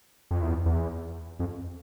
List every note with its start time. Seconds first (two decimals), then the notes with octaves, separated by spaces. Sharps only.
0.31 F2
0.42 E2
0.66 E2
1.39 F2